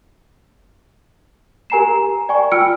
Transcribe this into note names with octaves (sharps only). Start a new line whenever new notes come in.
G4 A#4 G#5 A#5 C7 E7
D5 G5 G#5 C#6
F4 G5 E6 F6 C#7 D7